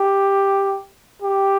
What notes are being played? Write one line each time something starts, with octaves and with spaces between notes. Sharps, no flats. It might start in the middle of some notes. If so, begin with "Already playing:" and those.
Already playing: G4
G4